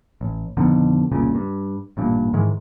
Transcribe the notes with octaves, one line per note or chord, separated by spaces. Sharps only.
A1
F2 B2 D3 D#3
E1 C2 A#2 C#3
G2
A1 G2 A#2
G#2 D#3 E3 G#3